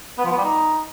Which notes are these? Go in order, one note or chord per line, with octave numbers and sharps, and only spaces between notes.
B3
F3
B3
G3
D#4